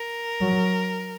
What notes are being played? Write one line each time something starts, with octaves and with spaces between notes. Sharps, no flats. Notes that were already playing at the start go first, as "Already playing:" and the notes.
Already playing: A#4
F#3